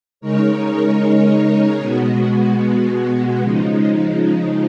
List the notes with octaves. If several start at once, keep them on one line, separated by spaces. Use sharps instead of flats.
C#3 G#3 D#4 A#4 C#5
B2 G#3 B3 F#4
C#3 F3 G#3 D#4